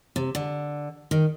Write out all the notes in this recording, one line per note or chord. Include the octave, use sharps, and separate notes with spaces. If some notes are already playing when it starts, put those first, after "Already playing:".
C3
D3
D#3